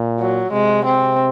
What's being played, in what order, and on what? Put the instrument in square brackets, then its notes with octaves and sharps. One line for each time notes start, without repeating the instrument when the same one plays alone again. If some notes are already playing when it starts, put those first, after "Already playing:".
Already playing: [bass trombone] A#2
[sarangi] F#3
[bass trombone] C3 [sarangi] G#3
[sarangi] C4